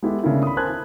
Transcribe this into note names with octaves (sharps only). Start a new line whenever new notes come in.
G#3 B3 E4 G4 A4
C#3 A3 B3 D4 E4 A#4
B5 D#6
A#4 C5 G#5 A5 F#6 G#6
E4